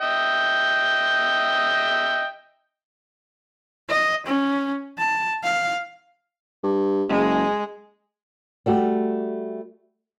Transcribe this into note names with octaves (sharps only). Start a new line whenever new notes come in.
D#5 E5 G5
D#5
C#4
A5
F5
G2
F#1 G#3
G3 A3 F#4 G4